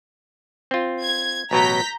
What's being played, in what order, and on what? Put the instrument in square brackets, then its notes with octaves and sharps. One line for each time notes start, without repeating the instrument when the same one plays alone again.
[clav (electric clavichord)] C4 F4
[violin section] G#6
[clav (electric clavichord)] A1 B2 F#3 [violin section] A#5 G6 B6